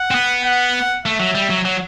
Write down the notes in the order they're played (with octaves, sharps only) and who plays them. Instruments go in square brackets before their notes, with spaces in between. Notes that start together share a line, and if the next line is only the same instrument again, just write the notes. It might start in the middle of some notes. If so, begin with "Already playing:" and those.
Already playing: [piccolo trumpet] F#5
[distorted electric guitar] C4
B3
[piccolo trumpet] F#5
[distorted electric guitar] A3 [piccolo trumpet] E5
[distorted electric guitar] F#3
G3
F#3
F#3